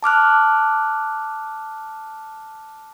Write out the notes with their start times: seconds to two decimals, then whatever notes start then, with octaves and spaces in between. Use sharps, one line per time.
0.03 A5 D6 F6 F#6